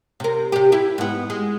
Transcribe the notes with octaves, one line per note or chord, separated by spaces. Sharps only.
C3 A#4
C3 G4
E4 G4
G#2 B3
G#3